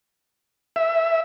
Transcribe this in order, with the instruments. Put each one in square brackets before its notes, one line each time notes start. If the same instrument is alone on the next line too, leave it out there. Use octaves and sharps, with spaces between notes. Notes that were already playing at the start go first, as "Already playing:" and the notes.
[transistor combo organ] E5